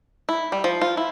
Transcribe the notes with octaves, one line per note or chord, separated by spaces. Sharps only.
E4
G3
F3
F4
E4